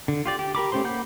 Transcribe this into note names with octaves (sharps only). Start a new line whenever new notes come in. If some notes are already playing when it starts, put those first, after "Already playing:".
D3
F4 G4 D5
G4
G4 A#4 B5 D6
A3 C#4 G4 C5 C6
A#3 F#5 B5 D6 G6